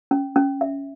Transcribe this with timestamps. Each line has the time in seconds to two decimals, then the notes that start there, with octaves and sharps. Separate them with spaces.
0.11 C#4
0.36 C#4
0.61 E5